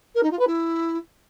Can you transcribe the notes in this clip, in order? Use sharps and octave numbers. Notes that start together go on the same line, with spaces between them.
A#4
D#4
F4
B4
E4